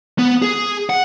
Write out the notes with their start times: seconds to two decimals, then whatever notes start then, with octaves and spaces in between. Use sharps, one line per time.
0.19 B3
0.42 G#4
0.90 F#5